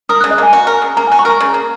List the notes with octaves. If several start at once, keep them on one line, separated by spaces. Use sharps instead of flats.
A#4 D#6
C#3 F#6
D#5
A#3 G#5
F#4
A#4
C#3
A#3 A#5
F#4 G#5
C#6
A#4 A#5
C#3
A#3